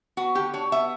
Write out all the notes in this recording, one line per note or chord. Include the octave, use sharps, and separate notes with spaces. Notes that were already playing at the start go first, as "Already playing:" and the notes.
B3 F#4
D3 G4
D4 C#5
B3 E5